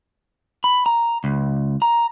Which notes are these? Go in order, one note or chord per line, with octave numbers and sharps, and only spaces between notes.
B5
A#5
C#2
A#5